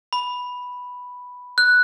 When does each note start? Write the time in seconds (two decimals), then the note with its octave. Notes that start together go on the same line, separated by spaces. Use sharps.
0.13 B5
1.58 F#6